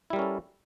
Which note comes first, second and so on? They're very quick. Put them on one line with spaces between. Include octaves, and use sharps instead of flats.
E4 G3 A#4 C#4 A4